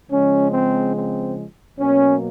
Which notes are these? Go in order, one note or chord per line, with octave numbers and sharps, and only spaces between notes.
C#3 F3 G#3 C#4
C4
C4
B2 F#3 A#3 C#4